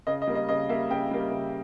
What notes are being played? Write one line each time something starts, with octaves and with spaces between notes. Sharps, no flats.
C#3 D#5
D#5
G3 A#3
D#5
C#3 D#5
G3 A#3 E5
C#3 G5
G3 A#3
C#3